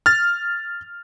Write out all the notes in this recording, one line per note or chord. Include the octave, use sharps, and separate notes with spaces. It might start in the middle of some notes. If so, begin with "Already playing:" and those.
F6 A6